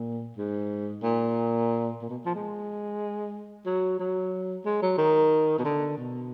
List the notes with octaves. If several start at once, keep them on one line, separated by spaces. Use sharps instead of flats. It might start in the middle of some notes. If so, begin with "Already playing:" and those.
Already playing: A#2
G#2
A#2
A#2
B2
F3
G#3
F#3
F#3
G#3
F#3
D#3
B2
D3
B2